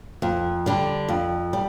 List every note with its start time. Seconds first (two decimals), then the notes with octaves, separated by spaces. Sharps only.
0.22 F2
0.66 D3 G3
1.08 F2
1.53 G3